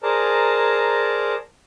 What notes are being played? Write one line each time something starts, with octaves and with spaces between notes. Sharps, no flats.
G#4 A#4 C5 D5 A5 A#5